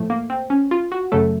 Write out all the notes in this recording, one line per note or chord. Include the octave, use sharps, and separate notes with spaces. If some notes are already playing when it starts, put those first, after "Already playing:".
Already playing: A2 F3 A3
A#3
C4
C#4
F4
F#4
F#2 C#3 F#3 A3 A4